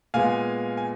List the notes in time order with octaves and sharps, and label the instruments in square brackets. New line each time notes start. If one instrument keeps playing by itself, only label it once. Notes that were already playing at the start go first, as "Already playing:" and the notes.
[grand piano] A#2 G#3 B3 F5 G#5
G#5